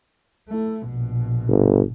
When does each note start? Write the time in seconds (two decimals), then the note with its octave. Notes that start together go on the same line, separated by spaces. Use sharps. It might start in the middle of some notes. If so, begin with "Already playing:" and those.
0.49 A3 E4
0.88 A#1 B2
1.49 G1